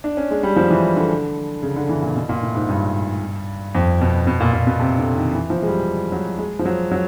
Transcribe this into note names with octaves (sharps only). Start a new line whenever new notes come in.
D4
C#4
G#3
G3
F3
E3
D3
C#3
D3
E3
A#2
B2
A#2
A2
G#2
G2
F2
B2
B2
A#2
A#2
B2
C3
D3
D#3
E3
F3
G#3
G3
F#3
G#3
F3
F#3
F#3